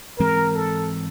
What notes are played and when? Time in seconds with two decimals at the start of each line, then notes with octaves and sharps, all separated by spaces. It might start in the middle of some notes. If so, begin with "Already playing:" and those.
0.18 G#2 E3 G#3 C4 A#4
0.55 A4